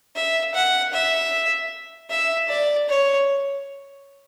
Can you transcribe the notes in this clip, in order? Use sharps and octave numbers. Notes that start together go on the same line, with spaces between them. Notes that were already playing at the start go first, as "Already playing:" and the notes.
E5
F#5
E5
E5
D5
C#5